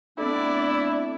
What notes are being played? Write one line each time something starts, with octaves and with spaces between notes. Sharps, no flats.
A3 B3 C4 D4 E4 A4 D5